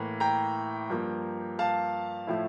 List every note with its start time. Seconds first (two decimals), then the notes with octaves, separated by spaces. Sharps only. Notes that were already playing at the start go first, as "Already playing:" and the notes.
Already playing: A2 E3 A#3
0.20 G5 A#5
0.90 G2 F3 A#3
1.59 F5 A5
2.27 A2 F3 A3 E4